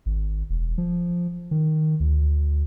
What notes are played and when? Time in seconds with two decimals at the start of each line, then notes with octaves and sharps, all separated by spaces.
0.06 G#1
0.50 E1
0.78 F3
1.51 D#3
2.00 D2